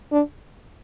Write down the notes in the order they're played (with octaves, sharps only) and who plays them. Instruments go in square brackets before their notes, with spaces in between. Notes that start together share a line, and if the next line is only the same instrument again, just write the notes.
[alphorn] D4